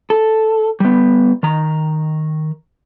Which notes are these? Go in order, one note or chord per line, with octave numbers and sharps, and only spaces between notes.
A4
G3 B3
D#3 A#5